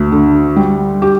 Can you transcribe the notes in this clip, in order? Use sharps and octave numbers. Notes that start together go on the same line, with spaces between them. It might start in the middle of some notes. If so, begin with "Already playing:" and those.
Already playing: D2
D3
G3
G4